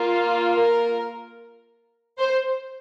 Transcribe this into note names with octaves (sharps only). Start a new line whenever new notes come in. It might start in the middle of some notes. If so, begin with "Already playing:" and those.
Already playing: A#3 F4
A#4
C5